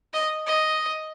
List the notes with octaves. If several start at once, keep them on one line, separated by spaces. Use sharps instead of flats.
D#5
D#5